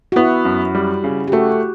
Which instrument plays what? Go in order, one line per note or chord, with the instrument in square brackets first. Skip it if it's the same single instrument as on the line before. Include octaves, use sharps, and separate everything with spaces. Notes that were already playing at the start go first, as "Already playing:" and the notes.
[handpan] F#4
[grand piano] B3 [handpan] E4
[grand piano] F#2
G3
C#3
[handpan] G4
[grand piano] A3 [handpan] F#4